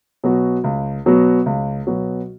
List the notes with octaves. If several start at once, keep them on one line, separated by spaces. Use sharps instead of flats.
B2 F#3 B3 F#4
C#2
B2 F#3 B3 F#4
C#2
B2 F#3 B3 F#4